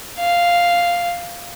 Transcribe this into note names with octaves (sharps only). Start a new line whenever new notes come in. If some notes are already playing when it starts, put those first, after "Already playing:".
F5